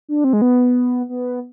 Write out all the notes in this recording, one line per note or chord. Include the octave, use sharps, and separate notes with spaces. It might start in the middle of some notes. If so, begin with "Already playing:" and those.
D4
C4
G#3
B3
B3